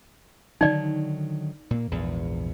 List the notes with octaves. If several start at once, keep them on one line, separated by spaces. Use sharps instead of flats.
D3 D#3 F#3 D#4 D5
A#2 A#3
A#1 E2 G#2